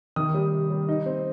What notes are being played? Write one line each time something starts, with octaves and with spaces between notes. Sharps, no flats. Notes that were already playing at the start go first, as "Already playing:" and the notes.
D#3 D#6
G3
C3
G3
D#4
C4